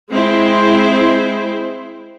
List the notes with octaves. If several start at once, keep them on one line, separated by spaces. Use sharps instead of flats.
G#3 C4 E4 C5